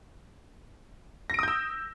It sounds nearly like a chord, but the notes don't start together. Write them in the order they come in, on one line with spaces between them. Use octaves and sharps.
A#6 D7 D#6 G6 E6